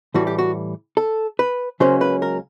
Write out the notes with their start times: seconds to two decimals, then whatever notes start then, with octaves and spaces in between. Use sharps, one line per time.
0.14 A2 E3 G3 F#4
0.27 G4
0.38 F#4
0.97 A4
1.39 B4
1.80 C#2 C#3 F#3 A#3 C#4 C5
2.01 B4
2.22 A#4